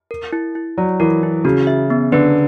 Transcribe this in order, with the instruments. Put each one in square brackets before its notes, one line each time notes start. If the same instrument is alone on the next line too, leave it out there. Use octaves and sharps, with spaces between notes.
[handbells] A#4
E4
E4
[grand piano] F#3 [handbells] D5
[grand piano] E3 [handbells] A#4
[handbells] E4
[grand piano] C#3 [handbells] F#4
[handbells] E5
B3
[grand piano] D3 [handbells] B4